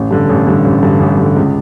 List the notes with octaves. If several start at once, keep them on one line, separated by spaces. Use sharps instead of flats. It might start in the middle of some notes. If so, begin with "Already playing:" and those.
Already playing: A1
G2 D3
A1
G2 D3
A1
G2 D3
A1
G2 D3
C#2